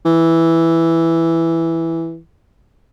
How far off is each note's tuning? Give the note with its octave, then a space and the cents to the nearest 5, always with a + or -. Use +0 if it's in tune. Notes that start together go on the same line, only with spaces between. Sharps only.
E3 +0